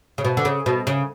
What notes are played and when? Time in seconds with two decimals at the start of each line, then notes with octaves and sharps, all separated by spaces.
0.18 C#3
0.25 B2
0.37 D3
0.45 C#3
0.66 B2
0.87 C#3